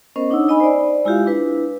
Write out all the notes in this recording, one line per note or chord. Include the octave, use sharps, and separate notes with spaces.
B3 C#4 A#4 C5 D#5
D4 D#4 C#5 F#5 D#6 E6
D#4 D#5 G#5 B5
C5 D5
G#3 E4 F4 G4 E5 F5
D4 E4 B4